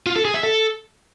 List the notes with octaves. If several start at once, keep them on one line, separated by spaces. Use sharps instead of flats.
F4
A4
G#4
E5
A4